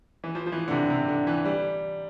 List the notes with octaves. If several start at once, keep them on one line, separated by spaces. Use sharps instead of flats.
E3
F3
F3
E3
D3
C3
C3
D3
E3
G3